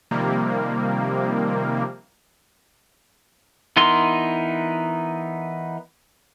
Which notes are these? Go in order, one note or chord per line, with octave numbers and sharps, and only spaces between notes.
C3 D#3 F3 G3 A#3
E3 B3 D#4 A#4 C6